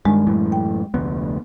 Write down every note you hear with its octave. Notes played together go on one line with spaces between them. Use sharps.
G2 D#3 G#3
F#2 A2 E3
G5
F1 D2 B3